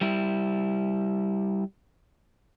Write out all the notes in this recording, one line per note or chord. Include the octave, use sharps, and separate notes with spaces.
G3 E4